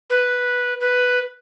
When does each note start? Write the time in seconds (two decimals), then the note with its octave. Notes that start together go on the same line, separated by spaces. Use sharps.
0.10 B4
0.80 B4